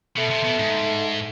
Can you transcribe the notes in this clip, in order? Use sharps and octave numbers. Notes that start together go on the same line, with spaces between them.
B2 A3
C3
B2
G#2